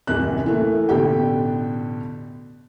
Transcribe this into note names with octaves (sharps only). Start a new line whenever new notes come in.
D#1 A1 F#2 C3 F#6
E3 A3 A#3
A1 B2 D3 G4 G5